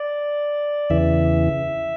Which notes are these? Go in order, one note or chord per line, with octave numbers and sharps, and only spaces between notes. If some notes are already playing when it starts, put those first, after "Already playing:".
Already playing: D5
E2 C#3 E3 E5